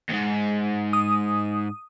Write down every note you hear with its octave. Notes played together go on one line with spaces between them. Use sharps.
D#2 G#2
D#6